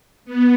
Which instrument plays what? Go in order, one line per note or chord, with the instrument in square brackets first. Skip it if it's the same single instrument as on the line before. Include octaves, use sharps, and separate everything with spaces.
[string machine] B3